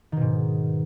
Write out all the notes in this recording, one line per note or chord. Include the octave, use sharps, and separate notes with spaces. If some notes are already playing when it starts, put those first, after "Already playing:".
G#2 B2 D#3